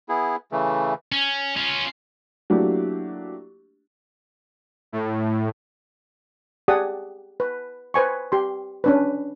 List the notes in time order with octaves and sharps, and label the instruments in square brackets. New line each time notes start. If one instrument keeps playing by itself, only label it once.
[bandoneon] B3 E4 G#4
C#3 E3 A3
[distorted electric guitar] C#4
C#4 F4
[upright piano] F#3 A3 A#3 D4 E4 G4
[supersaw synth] A2
[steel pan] G4 G#4 D5 F#5 A5 D#6
B4
B4 C5 G#5 C#6
G4 C6
C#4 D4 B4